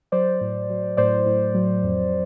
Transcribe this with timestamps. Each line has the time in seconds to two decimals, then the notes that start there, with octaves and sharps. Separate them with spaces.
0.12 F#3 C5 D5
0.41 A2
0.70 F#3
0.97 A2 C5 D5
1.26 A2
1.54 F#3
1.83 F2